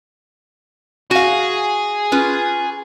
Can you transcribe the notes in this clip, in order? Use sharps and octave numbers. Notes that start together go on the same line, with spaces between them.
F#4 G#4 F5
C#4 F4 B4